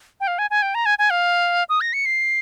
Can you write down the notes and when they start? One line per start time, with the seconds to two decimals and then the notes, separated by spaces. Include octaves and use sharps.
0.21 G5
0.27 F5
0.38 G#5
0.50 G#5
0.62 G5
0.75 A#5
0.86 G#5
0.99 G#5
1.10 F5
1.69 D#6
1.81 A#6
1.93 C#7
2.06 C7